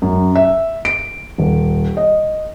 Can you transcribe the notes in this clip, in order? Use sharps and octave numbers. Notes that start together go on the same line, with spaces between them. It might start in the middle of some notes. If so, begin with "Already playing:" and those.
F#2
E5
D7
D#1
D#5